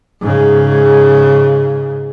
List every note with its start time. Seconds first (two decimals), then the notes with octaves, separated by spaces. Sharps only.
0.21 G#2 C#3